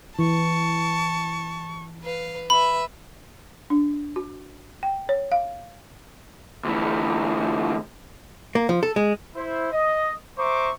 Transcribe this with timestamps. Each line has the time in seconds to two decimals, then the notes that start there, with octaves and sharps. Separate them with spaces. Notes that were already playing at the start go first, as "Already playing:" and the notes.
0.19 E3 A5 C#6
2.03 B4 F5
2.50 B4 E5 B5
3.70 D4
4.16 F#4
4.83 G5
5.09 C#5
5.32 F5
6.65 D2 E3
8.55 A#3
8.69 F3
8.83 A4
8.96 G#3
9.36 E4 C5
9.72 D#5
10.38 C5 E5 A#5 C#6 D6